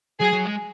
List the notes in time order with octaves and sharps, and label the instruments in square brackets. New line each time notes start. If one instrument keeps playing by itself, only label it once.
[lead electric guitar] F#3 [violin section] G#4
[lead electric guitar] F#3
G#3